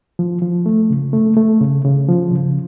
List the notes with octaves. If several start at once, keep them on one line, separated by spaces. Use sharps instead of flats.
F3
F3
A3
C#3
A3
A3
C#3
C#3
F3
C#3